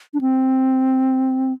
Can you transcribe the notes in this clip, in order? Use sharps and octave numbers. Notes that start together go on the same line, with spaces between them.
D4
C4